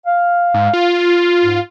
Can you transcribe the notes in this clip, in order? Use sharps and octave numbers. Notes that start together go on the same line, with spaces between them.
F5
G#2
F4
G#2